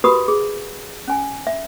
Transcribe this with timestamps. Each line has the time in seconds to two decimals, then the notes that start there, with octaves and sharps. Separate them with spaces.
0.04 F#4 G4 A#4 B4 B5 D#6
0.28 G#4
1.08 C#4 G#5
1.47 E5